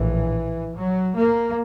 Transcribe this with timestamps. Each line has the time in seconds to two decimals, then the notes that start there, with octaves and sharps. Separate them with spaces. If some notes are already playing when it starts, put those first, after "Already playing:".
Already playing: A#1 A2 E3
0.74 F#3
1.15 A#3